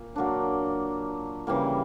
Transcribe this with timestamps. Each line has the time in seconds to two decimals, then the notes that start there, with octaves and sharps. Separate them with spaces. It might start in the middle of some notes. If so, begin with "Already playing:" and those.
Already playing: A#2
0.16 F#3 A#3 D4
1.47 C#3 E3 G3 A#3